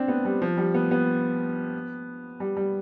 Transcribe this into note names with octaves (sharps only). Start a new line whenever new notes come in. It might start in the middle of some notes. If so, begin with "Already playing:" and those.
Already playing: C4 D4
B3
G3
F3
G3
B3
B3
G3
G3